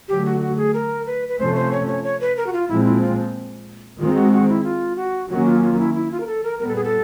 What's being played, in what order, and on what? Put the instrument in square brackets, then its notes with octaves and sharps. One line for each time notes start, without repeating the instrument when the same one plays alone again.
[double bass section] D3 F#3 A3 [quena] G4
[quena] F#4
F#4
G#4
A#4
B4
B4
[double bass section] C3 F3 A3 C#4 [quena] C5
[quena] C5
C#5
C#5
C#5
B4
A#4
F#4
F4
[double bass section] A#2 F3 G#3 C4 [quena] E4
[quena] E4
F4
[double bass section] D#3 G#3 C4 [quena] F4
[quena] F#4
F#4
E4
F4
F#4
[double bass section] D#3 F#3 A#3 C#4 [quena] F#4
[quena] F4
F4
E4
E4
F4
A#4
A4
A#4
[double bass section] A#2 G3 B3 [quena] A#4
[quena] A4
G#4
A4